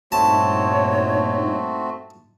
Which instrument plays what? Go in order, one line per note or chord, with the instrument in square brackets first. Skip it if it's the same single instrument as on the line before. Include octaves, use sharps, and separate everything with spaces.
[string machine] G2 A#2 D#4 [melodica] A3 C4 F#4 [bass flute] C#5 [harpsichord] A5